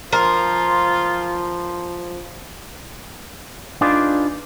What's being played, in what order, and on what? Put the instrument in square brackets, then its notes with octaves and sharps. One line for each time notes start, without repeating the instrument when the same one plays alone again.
[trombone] F3 [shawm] F4 [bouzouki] A#4
[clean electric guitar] D4 D#4 F4 G#4 B4 D5